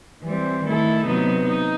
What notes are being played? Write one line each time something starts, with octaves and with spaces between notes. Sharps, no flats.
E3 G3 C4
D#3 A3 E4 A4
C3 F#3 B3 D#4
D#4